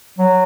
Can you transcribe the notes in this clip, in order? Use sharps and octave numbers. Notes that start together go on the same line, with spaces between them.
F#3